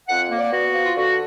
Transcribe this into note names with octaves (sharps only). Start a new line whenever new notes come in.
F2 F#5
A#3
D5
B3 F#4
F3
F4
D3 F#4